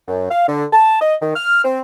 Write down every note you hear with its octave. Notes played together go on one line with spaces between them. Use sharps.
F#2
F5
D3
A5
D#5
D#3
F6
C4